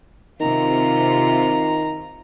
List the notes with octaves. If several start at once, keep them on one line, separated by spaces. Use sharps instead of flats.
C3 D#3 F4 A#5